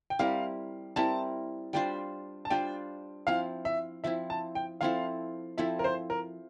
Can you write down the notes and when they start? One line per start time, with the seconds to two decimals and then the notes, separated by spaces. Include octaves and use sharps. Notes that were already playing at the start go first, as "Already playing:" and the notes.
0.10 G5
0.19 G3 C4 E4 A#4 F5
0.96 G3 C4 E4 A#4 A5
1.73 G3 D4 F4 C5 G5
2.45 A5
2.50 G3 D4 F4 C5 G5
3.27 F3 C4 E4 F5
3.65 E5
4.04 F3 C4 E4 E5
4.30 A5
4.55 G5
4.81 F3 C4 E4 A4 F5
5.58 F3 C4 E4 A4 E5
5.79 A#4
5.84 C5
6.10 A#4